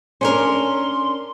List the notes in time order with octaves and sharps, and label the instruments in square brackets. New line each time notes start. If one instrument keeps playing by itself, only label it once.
[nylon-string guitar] C#4 D4 A#4 [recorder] C6